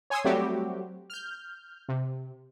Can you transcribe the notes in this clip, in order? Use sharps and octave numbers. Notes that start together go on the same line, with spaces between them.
C#5 G#5 C6 D#6 E6
F#3 G3 A3 C4 F#4 G4
F6 G6
C3